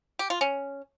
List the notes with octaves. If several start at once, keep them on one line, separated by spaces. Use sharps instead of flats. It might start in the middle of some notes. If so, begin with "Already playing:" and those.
G4
F4
C#4